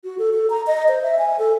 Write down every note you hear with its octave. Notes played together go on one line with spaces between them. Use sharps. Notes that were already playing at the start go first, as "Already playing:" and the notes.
F#4
A4
A4
A#5
D#5
C5
E5
G#5
A4